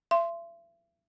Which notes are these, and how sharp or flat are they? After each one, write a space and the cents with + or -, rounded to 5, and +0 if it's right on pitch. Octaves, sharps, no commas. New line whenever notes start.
E5 +40 C6 +0